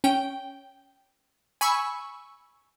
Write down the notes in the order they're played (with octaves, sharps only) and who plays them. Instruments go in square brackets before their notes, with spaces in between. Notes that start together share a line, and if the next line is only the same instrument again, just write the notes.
[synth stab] C#4 G5
G#5 B5 C#6 E6